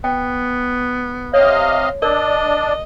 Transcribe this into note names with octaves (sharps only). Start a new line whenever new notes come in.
B3 G5
C3 C#5 D#5 F5
D4 A#4 D5 D#5